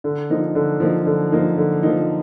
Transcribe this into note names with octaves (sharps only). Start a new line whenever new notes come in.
D3
F3 A#3 D#4
D3
F3 A#3 D#4
D3
F3 A#3 D#4
D3
F3 A#3 D#4